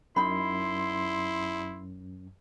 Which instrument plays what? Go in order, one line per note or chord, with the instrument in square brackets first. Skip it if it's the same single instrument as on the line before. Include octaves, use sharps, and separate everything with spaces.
[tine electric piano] F#2 [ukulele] D#4 B5 [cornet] E4 [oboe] C6